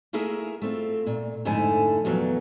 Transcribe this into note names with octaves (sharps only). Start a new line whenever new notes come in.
A3 A#3 E4 G#4 A#4 E5
A3 C4 F4
A#2
F2 G#2 D3 A3 E4 G#5
E2 A#2 F3 F#3 B4